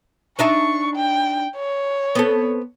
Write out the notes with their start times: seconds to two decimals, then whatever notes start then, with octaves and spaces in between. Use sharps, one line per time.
0.39 D4 D#4 E5 C#6
0.96 G5
1.56 C#5
2.15 B3 C4 A4